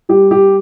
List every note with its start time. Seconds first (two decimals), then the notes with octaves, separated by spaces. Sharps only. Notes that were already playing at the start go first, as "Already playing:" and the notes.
0.09 G3 G4
0.31 G4